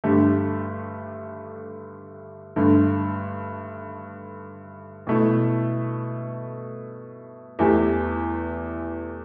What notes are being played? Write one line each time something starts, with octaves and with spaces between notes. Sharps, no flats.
G2 D3 A3 G4
G2 D3 A3
B2 A3 E4
E2 E3 A3 G4